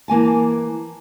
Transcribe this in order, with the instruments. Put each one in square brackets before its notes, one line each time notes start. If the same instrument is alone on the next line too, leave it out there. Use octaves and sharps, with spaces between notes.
[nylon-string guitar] E3 A#3 G#5 A5